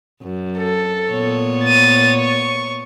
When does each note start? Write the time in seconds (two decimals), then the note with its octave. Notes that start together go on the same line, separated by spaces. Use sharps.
0.23 F#2
0.59 A4
1.11 A#2 B3 C#5
1.64 A6 D#7
2.20 C#6